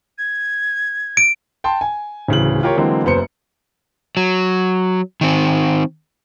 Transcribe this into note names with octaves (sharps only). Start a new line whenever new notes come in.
G#6
D7
G5 A5 C6
G#5
D1 C#3 E3 F#7
F4 G4 A#4 C#5
D3 E3 F#3 G#3 A#3 C4
F#1 F#2 B3 C5 C#7
F#3
D#3 C4